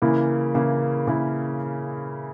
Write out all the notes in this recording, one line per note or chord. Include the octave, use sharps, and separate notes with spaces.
C#3 E3 A#3 E4
C#3 E3 A#3 E4
C#3 E3 A#3 E4